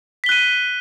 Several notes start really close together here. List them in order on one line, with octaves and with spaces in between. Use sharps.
B6 G7 F#6 D#7